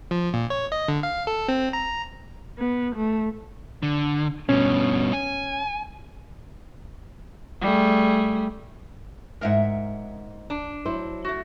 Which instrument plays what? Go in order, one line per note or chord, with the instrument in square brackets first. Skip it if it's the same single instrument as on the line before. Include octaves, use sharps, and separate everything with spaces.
[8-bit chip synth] F3
A#2
C#5
D#5
D3
F5
A4
C4
A#5
[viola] B3
A3
[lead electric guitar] D3
[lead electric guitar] G2 B2 [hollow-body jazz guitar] C#4
[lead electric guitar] G#5
[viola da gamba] G3 A3 G#4
[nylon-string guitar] D#2 G#2 [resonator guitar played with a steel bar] A#4 E5 F#5
[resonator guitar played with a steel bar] D4
[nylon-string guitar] F#3 E4 C5
[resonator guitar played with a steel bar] A3 F#4